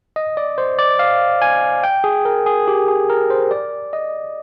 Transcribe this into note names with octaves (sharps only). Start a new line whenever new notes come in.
D#5
D5
C5
D5
F5
G#5
G5
G#4
A#4
G#4
G4
G#4
A#4
C5
D5
D#5